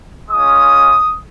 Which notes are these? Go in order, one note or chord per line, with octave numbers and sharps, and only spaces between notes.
G#3 C#4 F4 D#6